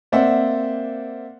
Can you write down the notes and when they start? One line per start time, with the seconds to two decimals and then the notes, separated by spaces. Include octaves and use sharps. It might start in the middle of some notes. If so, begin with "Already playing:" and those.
0.12 A#3 C4 C5 D5 E5 F#5